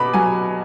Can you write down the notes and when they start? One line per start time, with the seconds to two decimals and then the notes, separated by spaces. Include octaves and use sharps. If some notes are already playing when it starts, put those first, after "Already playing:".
Already playing: B2 B5 D6
0.14 F#3 G#5